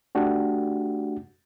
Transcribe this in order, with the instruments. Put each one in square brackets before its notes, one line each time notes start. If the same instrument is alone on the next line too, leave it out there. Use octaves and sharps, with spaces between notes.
[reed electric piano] A3 D4 F#4 G4